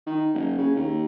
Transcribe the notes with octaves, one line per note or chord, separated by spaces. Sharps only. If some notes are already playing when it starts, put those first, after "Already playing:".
D#3
F#1
C#3
D#2